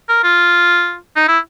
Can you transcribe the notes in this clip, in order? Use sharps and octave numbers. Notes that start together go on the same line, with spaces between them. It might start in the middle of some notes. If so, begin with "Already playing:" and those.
A#4
F4
D#4
E4